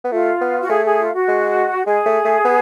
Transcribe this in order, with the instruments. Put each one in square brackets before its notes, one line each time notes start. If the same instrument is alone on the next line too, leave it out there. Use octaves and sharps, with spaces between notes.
[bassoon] B3
[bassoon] A3 [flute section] F4
[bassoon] B3
[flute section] F#4
[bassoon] A3 [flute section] G#4
[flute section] G#4
F4
F#4
[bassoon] G#3
[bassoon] G#3 [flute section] G#4
[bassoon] A3
A3
B3